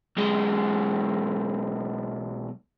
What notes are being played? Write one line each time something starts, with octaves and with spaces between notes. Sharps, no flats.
B1 G#3